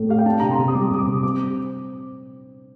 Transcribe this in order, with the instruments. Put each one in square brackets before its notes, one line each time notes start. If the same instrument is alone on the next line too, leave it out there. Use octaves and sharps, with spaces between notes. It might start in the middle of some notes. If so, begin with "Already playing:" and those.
Already playing: [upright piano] A2 A3
[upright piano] G4 [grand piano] F5
[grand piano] G5
[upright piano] D4 [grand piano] A5
[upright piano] C3 [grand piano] A#5
[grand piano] C6
[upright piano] C3
[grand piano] D#6
[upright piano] G3 [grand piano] D6
[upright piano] C3 [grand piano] D#6
[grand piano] D6
[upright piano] C3
[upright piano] C4 [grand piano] D6